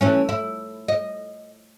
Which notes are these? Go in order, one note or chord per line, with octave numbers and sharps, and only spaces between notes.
E3 A3 C#4
E4
D#5